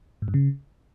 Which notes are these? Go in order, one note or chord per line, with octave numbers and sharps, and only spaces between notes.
G#2
G2
C#3